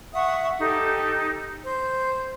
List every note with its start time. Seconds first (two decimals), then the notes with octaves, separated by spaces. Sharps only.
0.13 E5 F#5 C#6 D#6
0.59 D#4 G4 A4
1.64 C5 G6